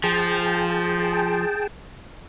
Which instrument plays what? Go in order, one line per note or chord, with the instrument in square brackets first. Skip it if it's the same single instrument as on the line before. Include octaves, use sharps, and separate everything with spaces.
[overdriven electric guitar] F3 [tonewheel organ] G#4 G5 A5